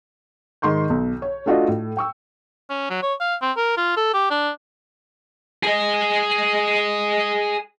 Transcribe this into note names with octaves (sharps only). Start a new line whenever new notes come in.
G#2 D#3 C6 C#6 G6
B1
C#5
A3 D4 F4 F#4 D5 D#5
A2 A3
G5 C#6 E6
C#4
F#3
C#5
F5
C4
A#4
F4
A4
G4
D4
G#4 D#5